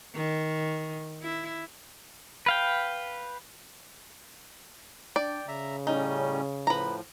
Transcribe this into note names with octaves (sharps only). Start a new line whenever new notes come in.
D#3
E4
B4 F5 G5
D4 D5 G5
C#3 E5 A#5
A2 G3 C#4 D#4
A2 F3 B4 A#5